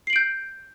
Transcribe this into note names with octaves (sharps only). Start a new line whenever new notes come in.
G6 C7 D7 F#7